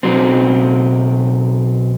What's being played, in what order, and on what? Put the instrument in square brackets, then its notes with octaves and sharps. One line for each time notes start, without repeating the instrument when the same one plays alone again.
[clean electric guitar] B1 F#3 C4